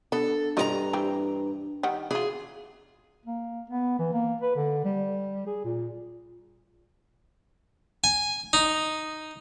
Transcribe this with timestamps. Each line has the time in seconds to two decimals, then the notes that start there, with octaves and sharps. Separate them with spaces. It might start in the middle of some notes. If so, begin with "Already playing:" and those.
0.12 B3 D4 A4
0.57 G2 F4 G4 D5 D#5 A#5
0.93 E3 G3 C4
1.83 D#3 G3 F#5
2.11 E3 F4 F#4 G#4
3.26 A#3
3.70 B3
3.99 E3
4.13 A#3
4.41 B4
4.56 D3
4.85 G3
5.46 G#4
5.65 A#2
8.04 G#5
8.53 D#4